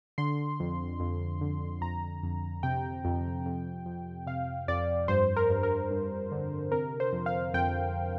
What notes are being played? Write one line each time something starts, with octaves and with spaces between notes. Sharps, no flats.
D3 C6
F2
F2
D3
F2 A#5
F2
C3 G5
F2
F2
F2
C3 F5
F2 D5
G2 C5
A#4
G2
A#4
G2
D3
C3 A#4
C5
F2
F5
F2 G5